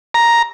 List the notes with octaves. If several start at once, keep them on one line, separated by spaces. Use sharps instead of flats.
A#5